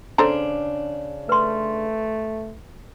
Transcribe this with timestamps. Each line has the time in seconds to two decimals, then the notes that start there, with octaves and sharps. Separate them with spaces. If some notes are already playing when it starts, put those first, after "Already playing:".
0.18 C#3 D4 A4 C5 A#5
1.29 A3 B4 C6